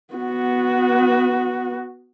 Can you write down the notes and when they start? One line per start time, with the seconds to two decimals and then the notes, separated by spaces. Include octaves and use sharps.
0.14 B3 F#4